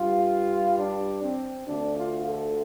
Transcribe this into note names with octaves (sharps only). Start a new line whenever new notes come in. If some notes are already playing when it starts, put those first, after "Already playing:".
Already playing: G2 G3 F4
D4
C4
D2 D3 A3 D4
F4
A4